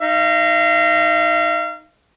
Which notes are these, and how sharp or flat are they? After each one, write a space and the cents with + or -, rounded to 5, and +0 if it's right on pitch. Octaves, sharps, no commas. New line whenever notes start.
D#4 +0 F5 -35